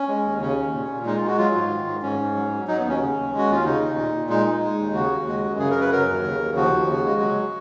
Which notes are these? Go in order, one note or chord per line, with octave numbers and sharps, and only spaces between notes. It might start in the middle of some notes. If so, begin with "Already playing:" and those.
Already playing: C#4
G#3
D#2
C#3 C#4
D#2
A#2
A#2
G#3 D#4
G#3 F4
F#4
F#3 F4
G#2
D#3
G#2
G#2 C#4
G#2
F#3
F#3
F#3 D#4
B3
D#2 C#4
C#3
D#2
G#3
F#4
D#2 F4
C#3 D#4
D#2
A#2
A#2
G#3 D#4
G#3
G#3
D#2
C#3 F#4
D#2
G#3
F#2
C#3 G#4
A#4
F#2 B4
F#3 A#4
D#2
C#3
D#2
F3 F#4
D#2
C#3
G#3
F#3